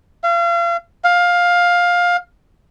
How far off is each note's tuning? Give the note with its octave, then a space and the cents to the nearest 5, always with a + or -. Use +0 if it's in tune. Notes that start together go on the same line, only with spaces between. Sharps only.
F5 -35
F5 +15